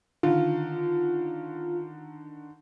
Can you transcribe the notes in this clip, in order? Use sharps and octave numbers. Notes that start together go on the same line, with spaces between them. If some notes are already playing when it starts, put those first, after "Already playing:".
D3 D#3 F4